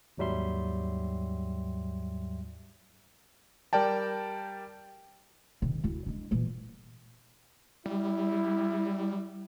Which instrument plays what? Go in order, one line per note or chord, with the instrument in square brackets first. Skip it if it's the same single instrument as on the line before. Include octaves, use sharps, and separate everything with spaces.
[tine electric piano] D#2 G#2 F#3 G3 E5 C6
[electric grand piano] G3 A#4 D5 G5 A5
[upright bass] C3 D#3
D2 E4
G#3 D4
A#2 E3
[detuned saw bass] G3 [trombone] E4